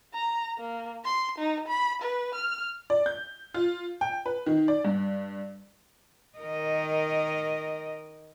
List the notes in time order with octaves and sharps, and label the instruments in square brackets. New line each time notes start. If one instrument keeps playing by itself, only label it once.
[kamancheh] A#5
A#3
C6
D#4
B5
B4
F6
[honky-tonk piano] D5
G6
F4
G5
B4
D#3
D5
G2
[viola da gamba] D#3 A#4 D#5